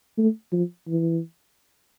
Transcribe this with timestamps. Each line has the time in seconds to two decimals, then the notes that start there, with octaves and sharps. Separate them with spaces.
0.18 A3
0.52 F3
0.88 E3